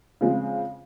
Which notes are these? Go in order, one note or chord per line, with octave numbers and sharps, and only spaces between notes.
C#3 F3 G#3 C4